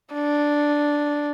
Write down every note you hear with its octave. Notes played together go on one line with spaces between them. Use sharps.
D4